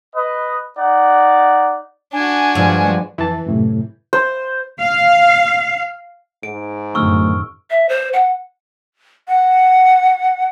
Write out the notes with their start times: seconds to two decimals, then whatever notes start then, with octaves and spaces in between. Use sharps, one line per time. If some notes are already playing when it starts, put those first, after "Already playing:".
0.15 B4 D#5
0.76 D#4 D5 F#5
2.13 D4 F#4 G#5
2.55 G2 F3 G#3
3.18 F2 E3 A5
3.46 F#2 A2 C3
4.13 C5
4.80 F5
6.43 G#2 D7
6.95 D1 F#2 A2 D#3 C#6 E6 F6
7.70 E5
7.89 C5
8.13 F#5
9.28 F#5